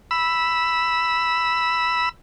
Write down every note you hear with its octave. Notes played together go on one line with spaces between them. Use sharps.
B5 E6